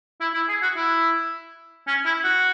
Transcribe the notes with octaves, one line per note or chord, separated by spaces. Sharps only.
E4
E4
G#4
F#4
E4
C#4
E4
F#4